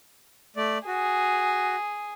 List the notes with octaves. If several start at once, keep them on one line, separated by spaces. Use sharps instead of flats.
A3 D5
F#4 G#4